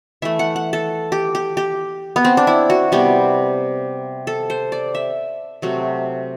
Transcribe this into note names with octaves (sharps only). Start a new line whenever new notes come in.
E3 A3 E5
F#5
F#5
A4
G4
G4
G4
B3
C4
D4
E4
F#4
C3 G3 B3 G4
A4
C5
D5
E5
C3 F#3 A3